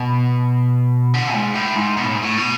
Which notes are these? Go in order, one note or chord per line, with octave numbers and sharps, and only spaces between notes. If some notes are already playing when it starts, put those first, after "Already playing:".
Already playing: B2
D3
G#2
A2
G#2
B2
A2
G#2
A2
B2